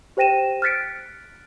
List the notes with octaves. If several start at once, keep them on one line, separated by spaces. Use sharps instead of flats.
G4 C5 G5 A#6 D#7 E7
F6 F#6 A6 B6 C#7 D7